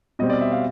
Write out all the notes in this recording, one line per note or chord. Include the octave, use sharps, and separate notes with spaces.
B2 G3 C4 D#5
D5
E5
F5